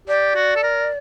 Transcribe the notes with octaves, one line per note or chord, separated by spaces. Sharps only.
G4 D5
F#4
A4
A#4